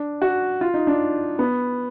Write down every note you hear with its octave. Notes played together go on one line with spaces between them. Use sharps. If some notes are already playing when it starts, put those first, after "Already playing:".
Already playing: D4
F#4
F4
D#4
D4
B3